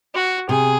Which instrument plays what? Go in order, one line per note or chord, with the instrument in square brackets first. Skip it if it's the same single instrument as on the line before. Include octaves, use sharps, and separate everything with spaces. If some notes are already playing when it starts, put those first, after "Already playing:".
[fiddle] F#4
[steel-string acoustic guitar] C3 [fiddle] G#4